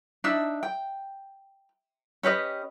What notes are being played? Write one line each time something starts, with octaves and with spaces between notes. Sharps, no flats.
D4 D#4 E5
G5
C#4 G4 B4 D#5